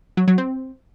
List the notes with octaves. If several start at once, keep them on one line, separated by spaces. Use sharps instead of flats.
F#3
F#3
C4